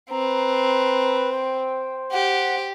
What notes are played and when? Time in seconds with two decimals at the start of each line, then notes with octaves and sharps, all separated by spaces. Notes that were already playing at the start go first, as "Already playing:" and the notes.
0.10 C4 B4 A#5
1.32 C5 G5
2.12 G4 F#5